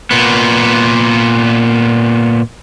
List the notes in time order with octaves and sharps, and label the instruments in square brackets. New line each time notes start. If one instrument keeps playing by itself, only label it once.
[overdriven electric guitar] A#2 B3